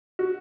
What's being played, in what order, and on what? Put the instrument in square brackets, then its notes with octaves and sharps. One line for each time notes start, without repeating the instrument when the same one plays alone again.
[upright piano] F#4